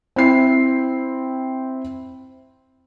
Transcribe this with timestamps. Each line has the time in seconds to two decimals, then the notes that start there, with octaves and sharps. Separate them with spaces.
0.16 C4 E4 C7